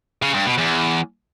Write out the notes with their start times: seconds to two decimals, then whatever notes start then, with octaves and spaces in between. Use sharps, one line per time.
0.22 C#3
0.34 G2
0.46 B2
0.58 E2